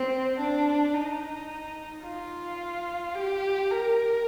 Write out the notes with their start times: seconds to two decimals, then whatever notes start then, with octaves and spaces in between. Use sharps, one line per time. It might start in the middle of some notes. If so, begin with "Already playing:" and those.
Already playing: C4
0.39 D4
0.94 D#4
2.04 F4
3.15 G4
3.70 A#4